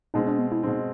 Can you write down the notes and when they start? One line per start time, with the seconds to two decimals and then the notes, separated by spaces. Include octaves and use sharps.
0.14 B2 G#3 C4 D#4
0.27 D4
0.39 B3
0.52 E4
0.63 B2 G#3 C4 D#4